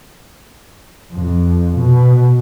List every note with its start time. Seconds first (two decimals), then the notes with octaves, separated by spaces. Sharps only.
1.13 F2
1.76 B2